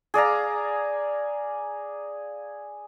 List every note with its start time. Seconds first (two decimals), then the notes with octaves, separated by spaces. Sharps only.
0.14 G#4 D5 F5 A#5